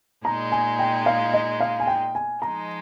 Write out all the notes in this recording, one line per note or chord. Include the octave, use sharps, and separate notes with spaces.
A#2 G#3 D#4 A#5
G#5
G5
F5
D#5
F5
G#5
G5
G#5
F3 G#3 D#4 A#5